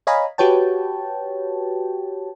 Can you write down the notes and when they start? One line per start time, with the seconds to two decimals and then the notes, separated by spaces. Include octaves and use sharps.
0.07 C#5 D#5 F5 G#5 A#5 B5
0.38 F#4 G4 B4 C#5 G5 A5